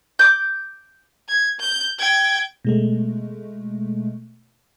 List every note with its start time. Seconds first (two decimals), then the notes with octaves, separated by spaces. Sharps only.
0.19 D6 G6
1.29 G#6
1.60 G6
1.99 G5 G#6
2.65 B2 G#3 A3